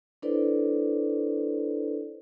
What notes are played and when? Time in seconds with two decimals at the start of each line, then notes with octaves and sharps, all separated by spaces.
0.22 D4 E4 A4 B4 C5 D5